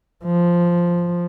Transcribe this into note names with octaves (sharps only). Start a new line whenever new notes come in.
F3